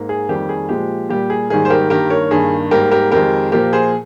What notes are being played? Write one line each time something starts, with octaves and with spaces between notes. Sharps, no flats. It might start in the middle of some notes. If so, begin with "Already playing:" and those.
Already playing: G#2 A#3
G#4
F2 D#3 G3 A#3 G4
G#4
A#2 F3 G#3 G4
A#2 G3 A#3 G4
G#4
G#2 D#3 G3 A#3 G#4
C5
G4 A#4
G2 D#3 A#3 G4 A#4
A#4 C#5
G2 D#3 A#3 G#4
G#2 G3 A#3 G4 A#4
G4 A#4
F2 D#3 G#3 G4 A#4
A#2 F3 A#3 G4 A#4
G#4 C5